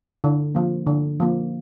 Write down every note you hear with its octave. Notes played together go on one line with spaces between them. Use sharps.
D3
F3 A#3
D3
F3 A#3